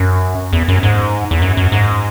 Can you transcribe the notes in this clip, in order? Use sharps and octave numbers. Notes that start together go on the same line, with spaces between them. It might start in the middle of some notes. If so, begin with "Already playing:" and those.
Already playing: F#2
E2
F#2
G#2
E2
F#2
F#2
G#2